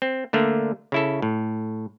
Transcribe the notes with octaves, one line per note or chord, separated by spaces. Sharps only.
C4
D3 A3 A#3 D4
C#3 E4 A4
A2